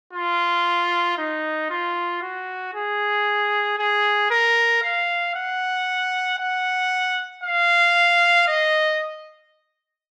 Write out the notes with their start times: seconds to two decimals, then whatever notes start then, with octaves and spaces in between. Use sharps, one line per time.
0.13 F4
1.17 D#4
1.70 F4
2.22 F#4
2.74 G#4
3.79 G#4
4.30 A#4
4.83 F5
5.35 F#5
6.39 F#5
7.44 F5
8.48 D#5